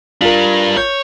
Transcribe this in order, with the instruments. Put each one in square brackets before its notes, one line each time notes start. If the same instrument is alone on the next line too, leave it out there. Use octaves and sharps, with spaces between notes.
[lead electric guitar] G3 D4 [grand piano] F4 A#4
[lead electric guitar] C#5 [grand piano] G6